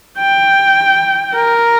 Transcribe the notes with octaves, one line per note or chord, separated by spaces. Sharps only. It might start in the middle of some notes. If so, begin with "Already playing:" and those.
G5
A#4